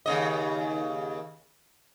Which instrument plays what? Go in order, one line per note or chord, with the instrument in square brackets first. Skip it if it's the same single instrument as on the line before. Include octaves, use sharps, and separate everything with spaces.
[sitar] D#2 C#3 D#5